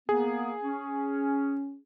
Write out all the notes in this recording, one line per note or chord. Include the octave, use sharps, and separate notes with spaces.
A#3 B3 G#4
C#4